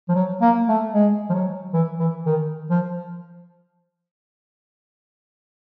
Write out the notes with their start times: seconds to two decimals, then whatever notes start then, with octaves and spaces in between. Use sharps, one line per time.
0.09 F3
0.15 F#3
0.41 A#3
0.68 A3
0.94 G#3
1.30 F3
1.33 F#3
1.73 E3
1.99 E3
2.26 D#3
2.70 F3